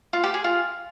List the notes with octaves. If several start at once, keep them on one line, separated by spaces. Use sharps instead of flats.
F4
G4
G#4
F4